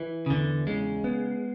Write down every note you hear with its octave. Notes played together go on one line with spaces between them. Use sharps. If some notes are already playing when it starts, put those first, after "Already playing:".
Already playing: E3
C#3
E2 D3
C#3 G#3
B3